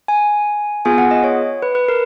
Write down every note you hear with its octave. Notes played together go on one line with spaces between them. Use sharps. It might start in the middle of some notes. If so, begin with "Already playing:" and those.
G#5
B3 F4 G#4 G#5
F#5
D#5
C#5
B4
B4
A#4